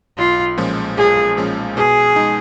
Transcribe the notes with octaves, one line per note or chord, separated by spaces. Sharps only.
B1 F4
A#2 F3 G#3 C#4
B1 G#4
A#2 F3 G#3 C#4
B2 G#4
G#3 D#4